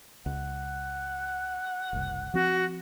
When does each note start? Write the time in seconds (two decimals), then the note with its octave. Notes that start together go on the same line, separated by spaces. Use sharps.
0.26 C#2 F#5
1.93 F#1 C2
2.34 F3 C4 F#4